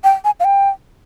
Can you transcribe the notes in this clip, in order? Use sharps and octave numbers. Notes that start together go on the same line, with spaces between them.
G5
G#5
F5
G5